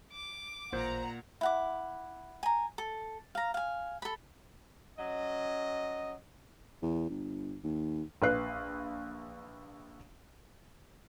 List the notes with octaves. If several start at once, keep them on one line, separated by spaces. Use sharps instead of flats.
D6
A1 A#2 C5 F#5 A#5 G6
E4 F#5 D6
G#5 A#5
A4
F5 A#5
F5 G#5
A4 B5
F#3 C#4 D#5
E2
G1
D#2
A#1 B4 F5 F#6 C7